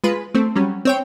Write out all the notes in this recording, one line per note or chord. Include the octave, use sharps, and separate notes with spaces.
G#3 F4 B4
A3 C4
F#3 G3 C#4
C4 C#5 G5